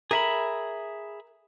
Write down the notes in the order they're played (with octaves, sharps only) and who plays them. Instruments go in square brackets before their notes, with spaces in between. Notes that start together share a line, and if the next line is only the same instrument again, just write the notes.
[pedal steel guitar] G#4 E5 B5 [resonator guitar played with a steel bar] A#4